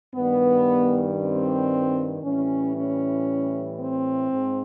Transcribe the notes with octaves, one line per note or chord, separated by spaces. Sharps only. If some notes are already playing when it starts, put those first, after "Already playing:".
G2 D#3 G3 B3
C4
A2 E3 G3 C#4
C#4
C4
G#2